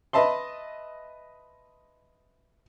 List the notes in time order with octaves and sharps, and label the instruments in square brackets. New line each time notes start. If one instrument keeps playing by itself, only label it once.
[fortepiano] B4 D#5 E5 A5 C6